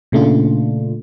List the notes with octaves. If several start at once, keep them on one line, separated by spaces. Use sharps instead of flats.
A#2 C#3 A3 D4 F4